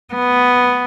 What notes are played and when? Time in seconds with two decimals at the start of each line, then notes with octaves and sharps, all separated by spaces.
0.14 B3